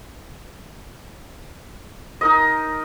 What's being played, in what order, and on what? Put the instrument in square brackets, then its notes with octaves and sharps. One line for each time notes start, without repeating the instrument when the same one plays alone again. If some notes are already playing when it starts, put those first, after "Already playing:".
[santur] D#4 A#4 D#5